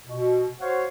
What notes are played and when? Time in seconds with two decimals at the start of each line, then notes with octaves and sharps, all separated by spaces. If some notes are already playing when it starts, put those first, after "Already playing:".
0.07 B2
0.60 F#4 C5 C#5 F5 F#5